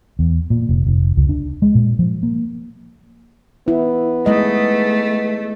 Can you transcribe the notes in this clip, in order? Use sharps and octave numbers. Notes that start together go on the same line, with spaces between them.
E2
A#2
F1
F1
C#2
D4
G#3
A#2
F3
A#3
B3 E4
G#3 A3 D#5